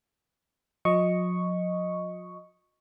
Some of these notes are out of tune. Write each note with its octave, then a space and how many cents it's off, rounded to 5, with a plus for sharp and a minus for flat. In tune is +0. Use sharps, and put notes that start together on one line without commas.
F3 +45 D#5 +0 C#6 +0